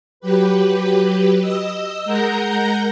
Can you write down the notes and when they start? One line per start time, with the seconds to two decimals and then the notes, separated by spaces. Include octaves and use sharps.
0.20 F#3 G4 B4
1.41 D#5 D#6 E6
2.05 G#3 A#4 F#5 A#5 G6 A#6